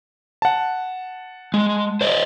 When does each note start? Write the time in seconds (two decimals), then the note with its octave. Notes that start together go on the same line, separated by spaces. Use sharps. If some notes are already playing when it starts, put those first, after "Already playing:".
0.42 F#5 A5
1.54 G#3
2.01 C5 D5 D#5